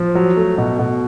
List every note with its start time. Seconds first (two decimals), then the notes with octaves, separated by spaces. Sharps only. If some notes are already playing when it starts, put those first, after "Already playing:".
Already playing: F3
0.15 F#3
0.36 A3
0.58 B2
0.79 B2